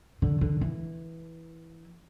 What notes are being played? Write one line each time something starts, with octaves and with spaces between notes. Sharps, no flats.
D3
D3
E3